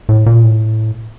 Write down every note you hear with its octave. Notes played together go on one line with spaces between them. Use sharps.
A2
A#2
A2